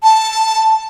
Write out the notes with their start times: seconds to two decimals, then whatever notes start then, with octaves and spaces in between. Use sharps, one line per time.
0.03 A5